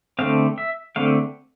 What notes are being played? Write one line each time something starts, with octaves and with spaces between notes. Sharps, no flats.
D3 A3 C4 F5
E5
D3 A3 C4 F5